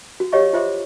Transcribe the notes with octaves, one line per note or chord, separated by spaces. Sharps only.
F#4
G4 C#5 D#5 F5 C#6
F4 C5 E5 C6 D6